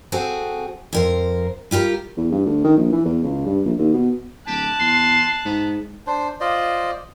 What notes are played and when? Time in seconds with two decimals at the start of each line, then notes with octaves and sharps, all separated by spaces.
0.12 C4 F#4 G#4 A4
0.93 F2 A#4 C5
1.71 G3 F4 G4 A#4
2.17 E2
2.32 G2
2.46 D2
2.64 D#3
2.76 A#1
2.92 E3
3.05 E2
3.24 C#2
3.46 G2
3.65 A#1
3.78 D#2
3.93 B2
4.47 D1 G4 A5 F#6
4.80 E2 C6
5.45 G#2 B3
6.07 D4 C5
6.41 F4 C5 D5 D#5